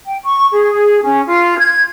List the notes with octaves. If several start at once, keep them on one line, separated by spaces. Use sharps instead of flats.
G5
C#6
G#4
C#4
F4
G#6